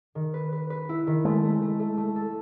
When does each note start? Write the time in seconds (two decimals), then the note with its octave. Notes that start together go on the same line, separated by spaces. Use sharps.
0.15 D#3
0.34 B4
0.52 B4
0.70 B4
0.89 E4
1.07 D#3
1.25 G#3 A3
1.44 A3
1.62 A3
1.80 A3
1.98 A3
2.16 A4